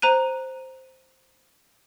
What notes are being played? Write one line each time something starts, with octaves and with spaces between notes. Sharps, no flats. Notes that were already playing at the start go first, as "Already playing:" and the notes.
C5 A#5 F#6 D#7